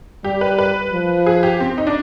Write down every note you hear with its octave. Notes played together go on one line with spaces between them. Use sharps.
G3 G4
B4
B4
F3
G#4
G4
C4
D#4
D4